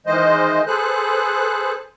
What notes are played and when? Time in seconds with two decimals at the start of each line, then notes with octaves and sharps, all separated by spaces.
0.06 D#3 E3 G#3 C5 D#5
0.67 G#4 A4 B4 C5 F#6